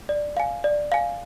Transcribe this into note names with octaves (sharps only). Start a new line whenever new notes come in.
D5
F5 G#5
D5
F5 G#5